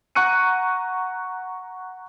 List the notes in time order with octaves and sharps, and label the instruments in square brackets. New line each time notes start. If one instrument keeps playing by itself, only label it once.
[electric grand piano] F#5 A#5 C#6 F#6 C#7 D#7